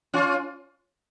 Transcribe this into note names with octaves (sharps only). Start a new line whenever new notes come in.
C#4 F4